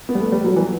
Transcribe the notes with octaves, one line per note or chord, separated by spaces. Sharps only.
B3
G3
A3
G3
F#3
E3